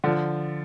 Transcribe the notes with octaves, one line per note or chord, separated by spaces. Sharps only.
D3 F3